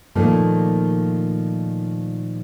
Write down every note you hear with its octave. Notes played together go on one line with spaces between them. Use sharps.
A#2 D#3 F3 A3 A#3